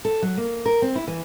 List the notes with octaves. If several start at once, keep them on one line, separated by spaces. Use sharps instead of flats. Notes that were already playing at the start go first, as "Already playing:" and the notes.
A4
F#3
A#3
A#4
C4
E4
E3